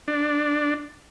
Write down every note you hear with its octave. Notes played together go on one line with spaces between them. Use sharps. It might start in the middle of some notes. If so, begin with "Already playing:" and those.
D4